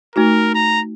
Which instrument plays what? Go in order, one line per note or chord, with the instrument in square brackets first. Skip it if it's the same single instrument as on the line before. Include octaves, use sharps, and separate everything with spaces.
[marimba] A3 D#4 F#4 [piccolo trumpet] A#4
[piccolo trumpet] A#5